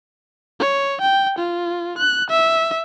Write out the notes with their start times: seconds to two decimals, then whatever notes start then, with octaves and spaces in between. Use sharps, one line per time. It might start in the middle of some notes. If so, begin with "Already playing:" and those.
0.60 C#5
1.01 G5
1.39 F4
1.98 F#6
2.30 E5